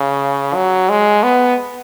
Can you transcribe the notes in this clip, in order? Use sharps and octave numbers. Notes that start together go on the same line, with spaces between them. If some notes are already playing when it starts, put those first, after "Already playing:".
Already playing: C#3
F#3
G#3
B3